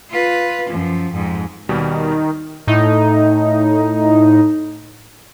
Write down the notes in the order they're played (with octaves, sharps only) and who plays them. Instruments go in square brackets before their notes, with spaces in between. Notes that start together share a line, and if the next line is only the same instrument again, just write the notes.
[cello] F4 B4
F#2 F3
F2 G#2
[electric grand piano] D#2 B2 G3 [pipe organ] D#3
[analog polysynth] A2 D#4